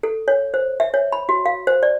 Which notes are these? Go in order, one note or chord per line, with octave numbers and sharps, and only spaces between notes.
A4
C#5
C5
E5
C#5
B5
F#4
F5
C5
D5